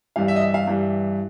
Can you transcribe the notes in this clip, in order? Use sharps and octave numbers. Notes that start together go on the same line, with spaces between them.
G2 E3 G3 F5
E5
D#5
E5
F5
G2 E3 G3